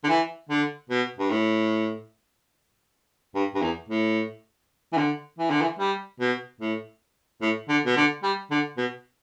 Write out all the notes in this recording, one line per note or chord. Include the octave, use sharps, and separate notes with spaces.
D3
E3
D3
B2
G2
A2
G2
G2
E2
A2
E3
D3
E3
D3
E3
G3
B2
A2
A2
D3
B2
D3
G3
D3
B2